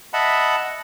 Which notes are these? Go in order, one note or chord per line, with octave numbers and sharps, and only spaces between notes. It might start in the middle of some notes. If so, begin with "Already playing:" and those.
D#5 E5 F#5 A5 B5